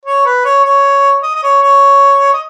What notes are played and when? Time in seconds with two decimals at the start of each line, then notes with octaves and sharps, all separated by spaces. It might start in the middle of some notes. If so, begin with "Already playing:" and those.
0.05 C#5
0.26 B4
0.45 C#5
0.64 C#5
1.23 D#5
1.35 D#5
1.43 C#5
1.62 C#5
2.33 D#5